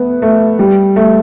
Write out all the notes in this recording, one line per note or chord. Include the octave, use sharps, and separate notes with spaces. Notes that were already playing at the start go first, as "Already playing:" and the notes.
Already playing: A3 B3
A3
G3
A3